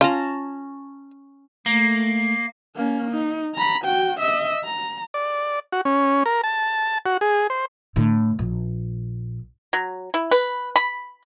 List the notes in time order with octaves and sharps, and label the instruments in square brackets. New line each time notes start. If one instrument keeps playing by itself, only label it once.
[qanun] C#4 A5 A#5 [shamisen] F4
[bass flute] A3 [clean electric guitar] A#3
[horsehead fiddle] A#3 C#4
D#4
A#5 B5
F#4 G5
D#5 E5
A#5
[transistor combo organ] D5
F#4
C#4
A#4
A5
F#4
G#4
C5
[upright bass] A2 D3
A#1
[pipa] F#3
E4
B4
B5